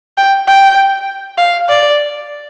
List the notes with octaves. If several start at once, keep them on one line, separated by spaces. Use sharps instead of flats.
G5
G5
F5
D5